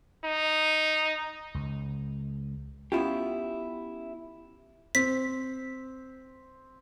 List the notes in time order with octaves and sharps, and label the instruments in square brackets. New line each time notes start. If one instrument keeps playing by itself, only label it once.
[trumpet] D#4
[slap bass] C#2
[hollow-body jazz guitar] B3 C#4 E4 F4 G4
[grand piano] C4 [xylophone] B6